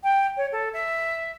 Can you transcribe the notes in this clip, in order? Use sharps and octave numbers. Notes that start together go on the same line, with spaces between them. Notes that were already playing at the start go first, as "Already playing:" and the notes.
G5
C#5
A4
E5